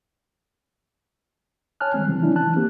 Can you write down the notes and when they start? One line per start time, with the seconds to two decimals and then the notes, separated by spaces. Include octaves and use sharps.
1.80 C#5 G#5 A5 F6 F#6
1.94 D#3 G3 G#3 C4
2.07 C3 E3 F#3 C4
2.23 C#4 D4 E4
2.36 E3 A5 F#6
2.56 A#3 C4 G4